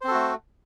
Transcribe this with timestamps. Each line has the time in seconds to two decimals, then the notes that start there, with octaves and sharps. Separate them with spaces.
0.01 C5
0.04 C4
0.08 A4
0.11 F#4
0.14 A3